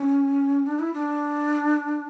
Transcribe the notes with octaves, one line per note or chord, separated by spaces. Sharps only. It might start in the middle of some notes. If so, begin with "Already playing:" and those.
Already playing: C#4
D4
E4
D4